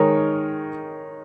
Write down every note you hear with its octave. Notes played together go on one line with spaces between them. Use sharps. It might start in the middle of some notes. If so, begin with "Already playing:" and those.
Already playing: D#3 G#3 D#4 A#4 C#5